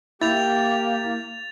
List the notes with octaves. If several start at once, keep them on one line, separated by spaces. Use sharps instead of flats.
A#3 E4 G4 A6 F7